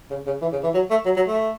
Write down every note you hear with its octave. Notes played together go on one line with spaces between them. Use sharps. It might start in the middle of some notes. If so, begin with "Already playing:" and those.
C#3
C#3
E3
C#3
E3
F#3
A3
F#3
F#3
A3